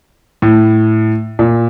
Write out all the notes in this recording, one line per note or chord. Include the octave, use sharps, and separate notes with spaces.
A2
A#2